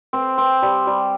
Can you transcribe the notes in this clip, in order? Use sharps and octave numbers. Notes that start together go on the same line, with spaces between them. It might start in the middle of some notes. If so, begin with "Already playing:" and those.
C4
C4
G3
G3